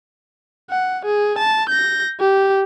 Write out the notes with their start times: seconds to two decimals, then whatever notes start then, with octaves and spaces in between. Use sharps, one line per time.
0.70 F#5
1.05 G#4
1.39 A5
1.69 G6 A#6
2.20 G4